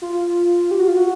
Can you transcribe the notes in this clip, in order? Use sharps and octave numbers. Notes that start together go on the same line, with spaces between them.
F4
G4
F#4
F4
F#4